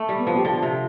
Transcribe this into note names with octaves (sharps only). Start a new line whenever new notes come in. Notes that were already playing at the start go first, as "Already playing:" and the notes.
Already playing: A3
G3
B3
F3
G4
D3 F4
C3